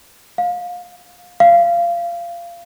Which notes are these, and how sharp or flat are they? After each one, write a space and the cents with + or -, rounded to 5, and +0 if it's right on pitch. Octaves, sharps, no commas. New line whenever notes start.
F5 +25
F5 -20